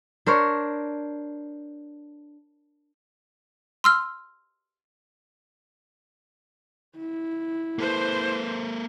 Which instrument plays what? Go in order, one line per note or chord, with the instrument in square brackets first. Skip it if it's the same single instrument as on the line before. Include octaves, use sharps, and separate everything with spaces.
[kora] D4 A#4 C5 C#5
[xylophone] C6 E6 F6
[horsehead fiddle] E4
[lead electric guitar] A#3 A4 [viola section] B4 C5